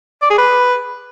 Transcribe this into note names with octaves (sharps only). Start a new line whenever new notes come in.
D5
G#4
B4